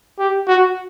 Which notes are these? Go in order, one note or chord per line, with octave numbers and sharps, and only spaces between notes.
G4
F#4